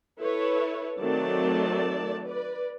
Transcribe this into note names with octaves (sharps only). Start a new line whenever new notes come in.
E4 A4 B4 C#5
D#3 F#3 A3 C4 D5 A5
B4 D5